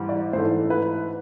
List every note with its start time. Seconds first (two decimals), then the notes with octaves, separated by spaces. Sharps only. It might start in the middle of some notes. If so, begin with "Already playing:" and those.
Already playing: G#2 E3 G3
0.09 D5
0.33 G#2 E3 A3 C5
0.70 B4